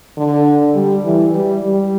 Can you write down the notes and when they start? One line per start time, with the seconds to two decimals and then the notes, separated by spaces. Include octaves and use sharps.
0.17 D3
0.75 G3
1.05 E3
1.34 G3
1.62 G3